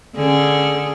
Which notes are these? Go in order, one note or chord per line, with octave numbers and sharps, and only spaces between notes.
D3 C#4 G#4